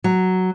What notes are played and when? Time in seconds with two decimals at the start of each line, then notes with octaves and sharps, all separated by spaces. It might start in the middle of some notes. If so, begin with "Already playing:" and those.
0.04 F#3